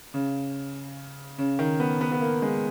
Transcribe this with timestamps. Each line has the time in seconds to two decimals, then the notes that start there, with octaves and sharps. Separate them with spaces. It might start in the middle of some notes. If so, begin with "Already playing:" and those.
0.14 C#3
1.38 C#3
1.59 D#3
1.80 B3
2.01 B3
2.12 B3
2.21 A#3
2.42 G#3